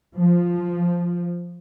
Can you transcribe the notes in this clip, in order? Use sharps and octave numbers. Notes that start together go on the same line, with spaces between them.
F3